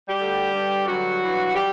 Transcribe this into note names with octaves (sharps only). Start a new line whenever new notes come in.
G3 G4
D2 D3
G2 D3
G2 D3 F#3 F#4
G2 E3
G3 G4